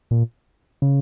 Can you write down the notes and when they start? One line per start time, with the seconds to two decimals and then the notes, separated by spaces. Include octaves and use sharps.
0.11 A#2
0.82 C#3